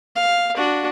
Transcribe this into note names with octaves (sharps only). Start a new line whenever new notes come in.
F5
D4 F#4